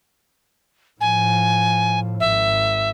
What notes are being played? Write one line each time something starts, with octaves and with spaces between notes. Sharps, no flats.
A2 F3 G#5
G#1 E5